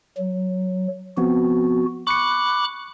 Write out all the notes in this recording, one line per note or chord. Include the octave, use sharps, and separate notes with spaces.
F#3
F3 B3 C4 F#4
B5 C#6 D6 F#6 C#7